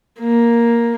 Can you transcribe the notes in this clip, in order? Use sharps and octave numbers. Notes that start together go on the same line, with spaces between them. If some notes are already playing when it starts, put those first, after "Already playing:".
A#3